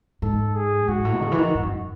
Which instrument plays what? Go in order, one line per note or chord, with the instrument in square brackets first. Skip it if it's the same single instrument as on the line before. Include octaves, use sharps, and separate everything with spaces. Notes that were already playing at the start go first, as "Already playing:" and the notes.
[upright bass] G#2 [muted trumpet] A4
[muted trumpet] G#4
[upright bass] G#2 [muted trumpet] F#4
[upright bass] A2
D#3
C#3
E3
D#3
G#2
F#2